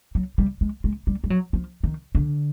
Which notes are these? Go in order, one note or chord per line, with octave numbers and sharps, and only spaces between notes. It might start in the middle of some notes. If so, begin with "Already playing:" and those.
F#3
G3
G#3
G#3
G3
G3
F#3
F3
D#3
D3